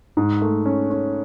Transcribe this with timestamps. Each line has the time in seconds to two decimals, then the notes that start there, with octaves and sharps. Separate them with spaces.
0.17 G#2
0.41 A3
0.66 C#4
0.90 C#4